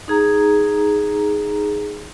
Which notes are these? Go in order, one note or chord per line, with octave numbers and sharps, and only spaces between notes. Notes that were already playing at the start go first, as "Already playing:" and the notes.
D#4 G#4 A#5